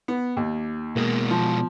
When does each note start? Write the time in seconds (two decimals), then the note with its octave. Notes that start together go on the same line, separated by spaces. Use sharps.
0.08 B3
0.37 D#2
0.96 B2 G#3 A#3
1.30 F3